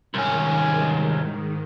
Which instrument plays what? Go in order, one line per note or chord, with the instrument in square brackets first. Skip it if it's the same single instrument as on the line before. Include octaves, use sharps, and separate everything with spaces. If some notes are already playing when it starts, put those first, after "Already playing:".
[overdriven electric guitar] C2 C#4 [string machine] G#2 D#3